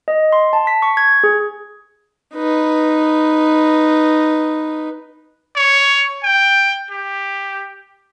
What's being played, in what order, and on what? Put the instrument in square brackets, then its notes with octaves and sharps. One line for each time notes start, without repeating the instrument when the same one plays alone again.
[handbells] D#5
C6
A5
B6
C#6
G#6
G#4
[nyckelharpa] D#4 B4
[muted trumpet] C#5
G5
G4